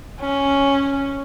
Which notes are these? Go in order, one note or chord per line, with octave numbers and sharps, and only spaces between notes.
C#4